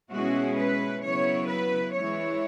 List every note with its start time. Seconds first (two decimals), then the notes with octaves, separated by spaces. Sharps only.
0.12 B2 G#3 C#4 E4 F#4
0.56 B4
1.02 C#3 F#3 B3 E4 C#5
1.48 B4
1.94 E3 G#3 E4 C#5